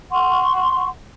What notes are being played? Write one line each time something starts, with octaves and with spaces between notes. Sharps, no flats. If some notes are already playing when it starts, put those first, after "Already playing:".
F#5 C6 C#6